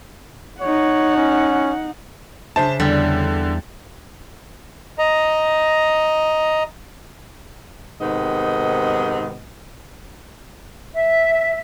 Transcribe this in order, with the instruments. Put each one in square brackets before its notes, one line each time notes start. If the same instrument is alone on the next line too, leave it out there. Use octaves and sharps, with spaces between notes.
[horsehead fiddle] D#4 F#5 [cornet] C#5
[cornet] C#4
[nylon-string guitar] C#3 D4 E5 [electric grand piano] C5 A5
[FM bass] E2 [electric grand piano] D3 [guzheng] G3
[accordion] D#5 A#5
[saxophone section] G#2 C3 D#3 B3 D#5
[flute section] E5